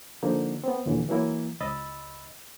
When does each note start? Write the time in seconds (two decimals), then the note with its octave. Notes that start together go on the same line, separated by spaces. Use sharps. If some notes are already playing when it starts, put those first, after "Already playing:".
0.23 D3 F3 A#3 D#4
0.64 B3 C4
0.86 D#2 A#2 D3 E3
1.09 E3 F#3 A#3 E4
1.60 C#2 D#5 B5 E6 A6